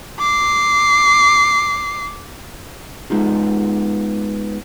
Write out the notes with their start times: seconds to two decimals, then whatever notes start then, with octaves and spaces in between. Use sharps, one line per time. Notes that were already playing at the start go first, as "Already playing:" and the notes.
0.19 D6 C7
3.10 G#3 B3 D#4 F4